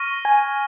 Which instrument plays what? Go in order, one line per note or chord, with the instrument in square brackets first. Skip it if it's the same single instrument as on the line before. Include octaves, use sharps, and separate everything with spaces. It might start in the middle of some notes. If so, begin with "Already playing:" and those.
Already playing: [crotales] C#6 F6 A#6 D#7
[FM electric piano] G#5